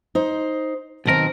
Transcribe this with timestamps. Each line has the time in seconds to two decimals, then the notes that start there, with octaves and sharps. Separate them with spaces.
0.15 D#4 C5
1.06 B1 B2 D#3 C4 A#4